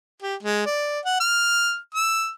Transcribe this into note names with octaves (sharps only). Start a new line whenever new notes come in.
G4
G#3
D5
F#5
F6
E6